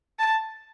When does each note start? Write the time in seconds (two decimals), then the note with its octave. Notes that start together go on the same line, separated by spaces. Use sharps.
0.19 A5